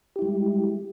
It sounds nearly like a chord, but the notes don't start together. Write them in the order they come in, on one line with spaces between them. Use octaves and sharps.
G4 E4 G3 G#3